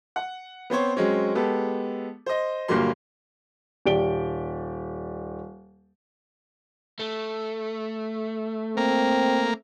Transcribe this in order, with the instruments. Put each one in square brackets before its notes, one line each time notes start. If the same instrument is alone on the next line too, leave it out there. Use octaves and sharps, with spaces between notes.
[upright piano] F#5
B3 C4 C5 C#5
F#3 G#3 C4 C#4
G#3 B3 G4 A4
C5 D#5
G1 A#2 F#3 G3 A#3 C6
[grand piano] D#1 G4 D5 D7 G7
[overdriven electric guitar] A3
[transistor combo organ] A#3 [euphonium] C4